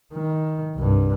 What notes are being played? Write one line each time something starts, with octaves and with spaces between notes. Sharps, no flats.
D#3
C2 G2